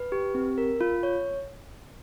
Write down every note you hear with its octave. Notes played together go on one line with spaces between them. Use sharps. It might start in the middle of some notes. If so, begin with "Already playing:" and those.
Already playing: B4
G4
C4
A#4
F4
C#5